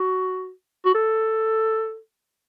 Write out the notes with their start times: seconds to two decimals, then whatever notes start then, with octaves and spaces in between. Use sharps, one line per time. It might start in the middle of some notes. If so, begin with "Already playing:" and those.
Already playing: F#4
0.85 F#4
0.95 A4